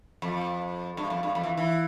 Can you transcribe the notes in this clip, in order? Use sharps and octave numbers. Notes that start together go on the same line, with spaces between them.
F2
G2
F2
G2
F2
E3
E3